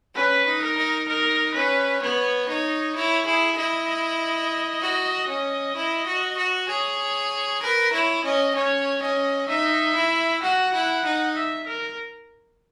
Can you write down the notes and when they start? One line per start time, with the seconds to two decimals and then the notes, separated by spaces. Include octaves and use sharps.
0.15 C#4 B4
0.47 D#4
0.62 A#4
0.77 D#4
1.08 D#4 A#4
1.54 C#4 B4
2.02 B3 C#5
2.48 D#4 C#5
2.95 E4 C#5
3.26 E4 G#4
3.57 E4 D#5
3.88 D#5
4.81 F#4
5.28 C#4
5.76 E4
6.06 F#4
6.37 F#4
6.68 G#4 C#5
7.62 A#4 B4
7.93 E4 C#5
8.24 C#4 D#5
8.55 C#4 C#5
9.02 C#4 D#5
9.48 D#4 E5
9.95 E4
10.42 F#4 F#5
10.74 E4
11.05 D#4
11.36 E5
11.67 A#4